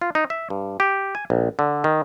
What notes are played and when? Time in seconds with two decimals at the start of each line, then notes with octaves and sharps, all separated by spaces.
0.02 F4
0.15 D#4
0.30 E5
0.50 G2
0.80 G4
1.15 G#5
1.30 A#1
1.59 D3
1.84 D#3